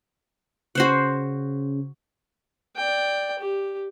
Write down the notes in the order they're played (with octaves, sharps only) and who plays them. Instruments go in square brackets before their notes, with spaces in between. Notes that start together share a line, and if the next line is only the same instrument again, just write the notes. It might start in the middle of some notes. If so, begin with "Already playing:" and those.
[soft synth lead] C#3 [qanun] F#4 C5 F#5
[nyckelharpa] D5 G5
G4